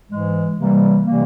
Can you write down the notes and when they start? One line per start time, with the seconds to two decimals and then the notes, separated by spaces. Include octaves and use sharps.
0.09 G#2 E3 G#3
0.56 C3 E3 G3 A#3
1.04 C3 E3 G3 A#3